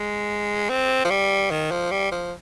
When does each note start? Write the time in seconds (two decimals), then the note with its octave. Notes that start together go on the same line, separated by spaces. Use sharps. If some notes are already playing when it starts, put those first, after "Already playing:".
Already playing: G#3
0.70 C4
1.05 F3
1.10 G3
1.51 D#3
1.71 F3
1.91 G3
2.11 F3